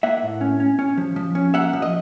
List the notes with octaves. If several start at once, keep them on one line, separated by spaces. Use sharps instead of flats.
A#3 E5 F#5
A2
C#4
C#4
C#4
F3
F3
C#4
A#3 E5 F#5
F3
D#5